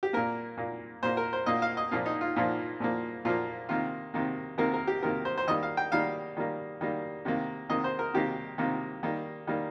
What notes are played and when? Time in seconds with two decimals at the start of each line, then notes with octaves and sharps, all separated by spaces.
0.03 G4
0.13 A#2 A#3 A#4
0.57 A#2 A#3
1.03 A#2 A#3 C5
1.17 A#4
1.33 C5
1.46 A#2 A#3 D#5
1.62 F5
1.77 D#5
1.91 A#2 F3 A#3 F4
2.06 D#4
2.21 F4
2.36 A#2 F3 A#3
2.80 A#2 F3 A#3
3.25 A#2 F3 A#3 F4
3.69 C3 D#3 A#3 F4
4.14 C3 D#3 A#3
4.58 C3 D#3 A#3 A#4
4.74 A#4
4.87 G4
5.03 C3 D#3 A#3 A#4
5.25 C5
5.37 C5
5.47 D#3 G3 A#3 D#5
5.63 F5
5.77 G5
5.92 D#3 G3 A#3 F5
6.37 D#3 G3 A#3
6.81 D#3 G3 A#3
7.25 C3 D#3 A#3
7.69 C3 D#3 A#3 D#5
7.84 C5
7.99 A#4
8.13 C3 D#3 A#3 G4
8.58 C3 D#3 A#3
9.03 D#3 G3 A#3
9.47 D#3 G3 A#3